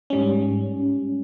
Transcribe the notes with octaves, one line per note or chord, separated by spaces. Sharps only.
G#2 G3 C#4